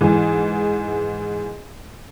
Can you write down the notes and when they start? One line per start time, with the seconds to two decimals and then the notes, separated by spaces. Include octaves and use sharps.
0.01 G#2 E3 G#4